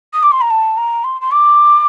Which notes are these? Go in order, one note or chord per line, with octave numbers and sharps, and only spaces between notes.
D#6
D6
C6
A#5
A5
A#5
C6
C6
D6